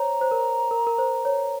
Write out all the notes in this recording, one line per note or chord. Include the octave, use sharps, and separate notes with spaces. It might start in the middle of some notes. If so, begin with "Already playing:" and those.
Already playing: C5 C#5 A#5
C5
A#4
A#4
A#4
C5
C#5